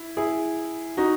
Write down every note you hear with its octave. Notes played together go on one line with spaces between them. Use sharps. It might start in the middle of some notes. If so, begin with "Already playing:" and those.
Already playing: E4
E4 G#4
D#4 F#4